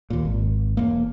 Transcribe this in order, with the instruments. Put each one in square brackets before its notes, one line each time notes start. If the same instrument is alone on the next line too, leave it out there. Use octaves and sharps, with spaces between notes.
[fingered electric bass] D#2 A#2
G#1
E1 A#3